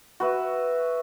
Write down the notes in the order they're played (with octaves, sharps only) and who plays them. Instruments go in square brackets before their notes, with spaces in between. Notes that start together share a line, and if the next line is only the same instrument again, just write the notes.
[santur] F#4 B4 E5